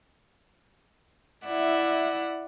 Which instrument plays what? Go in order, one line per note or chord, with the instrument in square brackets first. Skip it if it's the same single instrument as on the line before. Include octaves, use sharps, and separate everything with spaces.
[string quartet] E4 D5 E5 F#5